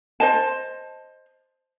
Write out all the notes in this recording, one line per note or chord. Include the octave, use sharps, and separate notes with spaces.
C5 D#5 A5